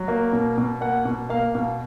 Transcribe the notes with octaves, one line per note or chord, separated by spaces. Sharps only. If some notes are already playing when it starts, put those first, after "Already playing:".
Already playing: F#3
A#3
B2
B2
A#3 F#5
B2
A#3 F5
B2 F5